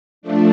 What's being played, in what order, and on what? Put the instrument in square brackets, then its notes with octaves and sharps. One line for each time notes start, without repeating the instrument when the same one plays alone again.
[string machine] F3 A3 D4